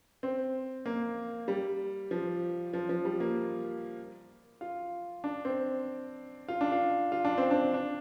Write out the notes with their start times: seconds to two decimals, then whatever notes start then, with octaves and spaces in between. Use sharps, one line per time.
0.23 C4
0.86 A#3
1.48 G3
2.11 F3
2.73 F3
2.89 F3
3.05 G3
3.20 A#3
4.61 F4
5.24 D4
5.45 C4
6.48 F4
6.61 D4
6.72 F4
7.12 F4
7.25 D4
7.38 C4
7.51 D4
7.74 D4